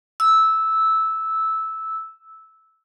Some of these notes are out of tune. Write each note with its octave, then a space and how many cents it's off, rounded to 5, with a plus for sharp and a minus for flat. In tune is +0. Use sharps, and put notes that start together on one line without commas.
E6 -10